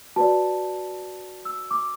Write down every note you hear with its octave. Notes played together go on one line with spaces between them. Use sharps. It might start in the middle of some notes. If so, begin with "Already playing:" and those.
F#4 B4 D5 A5
E6
D6